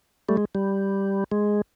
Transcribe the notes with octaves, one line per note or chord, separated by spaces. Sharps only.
G3 A3
G#3
G3
G#3